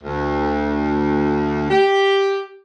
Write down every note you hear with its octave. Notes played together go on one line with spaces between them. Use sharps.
D2
G4